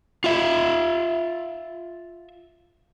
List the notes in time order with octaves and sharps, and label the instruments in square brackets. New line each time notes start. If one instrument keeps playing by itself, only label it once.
[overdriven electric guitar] F4 E5